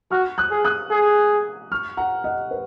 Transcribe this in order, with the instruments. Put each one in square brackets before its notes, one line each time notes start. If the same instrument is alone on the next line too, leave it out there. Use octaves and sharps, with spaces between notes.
[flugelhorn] F#4 [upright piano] C#6 F6
[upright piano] D#6 F#6
[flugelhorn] G#4
[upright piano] D#6 F#6
[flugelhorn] G#4
[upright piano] C#6 F6
F#5 A#5
D#5 F#5
B4